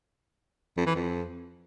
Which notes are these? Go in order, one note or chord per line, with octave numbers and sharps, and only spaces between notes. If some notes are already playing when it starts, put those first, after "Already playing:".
F2
E3
F2